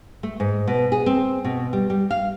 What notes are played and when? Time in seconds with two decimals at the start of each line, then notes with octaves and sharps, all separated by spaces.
0.23 A3
0.40 G#2
0.68 B2
0.92 G#4
1.06 C4
1.45 B2
1.73 G3
1.90 G3
2.11 F5